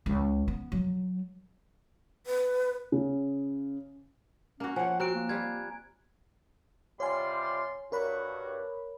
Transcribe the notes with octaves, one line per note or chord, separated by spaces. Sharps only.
C#2
B3
F#3
B4
C#3
A#3 C#4 F#4
F3 C#5 F#5 G#5
C4 F#4 A#5 F#6 D7
A#3
G3 F4 G#6
C3 G3 F4 C#5 G#5 C6
G2 F#4 A#4 C#5 B5